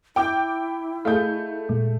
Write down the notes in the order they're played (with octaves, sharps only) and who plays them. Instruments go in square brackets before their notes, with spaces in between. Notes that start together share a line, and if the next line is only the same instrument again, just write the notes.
[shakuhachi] E4 [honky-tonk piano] G5 D6 G6
[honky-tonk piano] A3 G6 [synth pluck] G#4 D#5 F5
[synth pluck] A#2 G#3